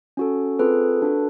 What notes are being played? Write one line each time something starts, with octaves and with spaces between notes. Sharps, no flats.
C#4 F#4 A4
C4 F4 G#4 A4 B4
D4 F#4 A4